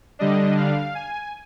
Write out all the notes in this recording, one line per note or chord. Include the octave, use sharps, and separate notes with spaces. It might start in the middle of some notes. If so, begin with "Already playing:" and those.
D3 G3 D4 D#5
F5
G#5